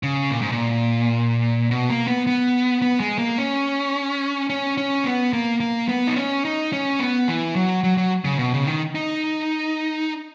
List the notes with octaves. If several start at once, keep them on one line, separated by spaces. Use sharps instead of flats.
C#3
A#2
G#2
A#2
B2
A#3
B3
B3
B3
G#3
A#3
C#4
C#4
C#4
B3
A#3
A#3
B3
D#4
C#4
D#4
C#4
B3
E3
F#3
F#3
F#3
C#3
B2
C#3
D#3
D#4